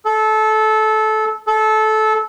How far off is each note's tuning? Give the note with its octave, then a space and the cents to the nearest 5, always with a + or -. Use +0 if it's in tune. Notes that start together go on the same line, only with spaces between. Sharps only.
A4 -20
A4 -20